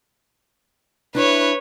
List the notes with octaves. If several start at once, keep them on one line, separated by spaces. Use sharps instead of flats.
D4 E4 B4 C#5